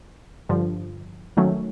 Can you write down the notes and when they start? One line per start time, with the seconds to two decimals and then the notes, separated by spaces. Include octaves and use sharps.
0.49 G2 D3 F3
1.37 D#3 F#3 A3 C#4